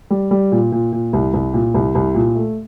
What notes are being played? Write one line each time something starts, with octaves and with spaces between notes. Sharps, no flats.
G3
G3
A#2
A#2
A#2
C2
C2
A#2
C2
C2
A#2
A3